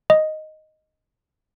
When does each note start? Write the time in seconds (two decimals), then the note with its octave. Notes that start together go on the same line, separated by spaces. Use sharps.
0.10 D#5